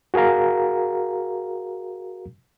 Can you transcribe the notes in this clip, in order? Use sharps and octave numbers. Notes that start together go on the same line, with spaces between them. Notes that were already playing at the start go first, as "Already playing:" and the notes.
F#4 G#4 A#4 F5 A#5